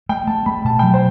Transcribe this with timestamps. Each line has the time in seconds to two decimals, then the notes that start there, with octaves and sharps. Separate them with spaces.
0.09 A3 G5
0.27 A3 A5
0.46 A3 B5
0.65 B2 A5
0.79 G5
0.83 F#3
0.94 C5